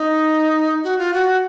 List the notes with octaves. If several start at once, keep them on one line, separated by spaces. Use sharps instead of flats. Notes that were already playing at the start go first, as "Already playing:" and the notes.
Already playing: D#4
F#4
F4
F#4